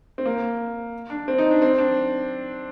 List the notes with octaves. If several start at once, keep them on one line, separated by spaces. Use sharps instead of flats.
C4
A#3
D4
C4
D#4
D4
C4
D4